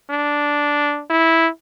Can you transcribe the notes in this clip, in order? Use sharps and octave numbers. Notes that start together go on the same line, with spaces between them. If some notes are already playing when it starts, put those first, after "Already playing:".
D4
E4